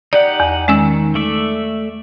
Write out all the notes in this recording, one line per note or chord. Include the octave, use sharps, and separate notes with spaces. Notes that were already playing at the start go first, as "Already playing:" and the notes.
D#4 G4 D5 F#5
E2
D#3 G#3 C#4 E6
A3 D5 E5